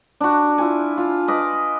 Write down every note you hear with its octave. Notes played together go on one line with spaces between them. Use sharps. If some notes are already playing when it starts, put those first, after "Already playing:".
D4 F#4
E4 F4 G#5
F4
B4 D#5 D6